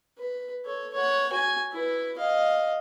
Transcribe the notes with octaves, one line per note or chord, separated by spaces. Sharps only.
B4
A4 C#5
C#5 F#5
F#4 G#5
E4 B4
D#5 F5